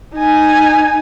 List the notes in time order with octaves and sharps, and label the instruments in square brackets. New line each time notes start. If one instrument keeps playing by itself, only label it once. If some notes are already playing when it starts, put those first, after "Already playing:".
[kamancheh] D#4 G#5